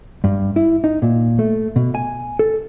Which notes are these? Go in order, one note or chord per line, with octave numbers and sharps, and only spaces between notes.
G2
E4
D#4
A#2
A3
B2
G#5
A4